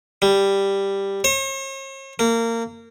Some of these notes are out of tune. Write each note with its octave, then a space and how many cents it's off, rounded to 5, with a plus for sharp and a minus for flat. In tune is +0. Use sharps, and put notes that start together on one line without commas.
G3 +5
C#5 -45
A#3 -25